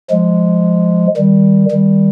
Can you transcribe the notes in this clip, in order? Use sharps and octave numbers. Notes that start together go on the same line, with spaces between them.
F3 G#3
D#3 G3
D#3 G3